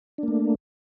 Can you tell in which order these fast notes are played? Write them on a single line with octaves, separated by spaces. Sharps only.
D4 A#3 A3